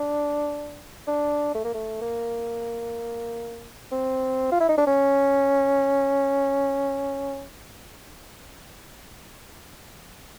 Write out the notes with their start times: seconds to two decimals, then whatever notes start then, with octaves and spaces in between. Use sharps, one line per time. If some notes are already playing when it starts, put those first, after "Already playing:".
Already playing: D4
1.07 D4
1.55 A3
1.64 A#3
1.74 A3
2.01 A#3
3.92 C4
4.52 F4
4.60 E4
4.69 D#4
4.78 D4
4.87 C#4